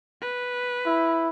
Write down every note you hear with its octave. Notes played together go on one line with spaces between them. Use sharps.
B4
E4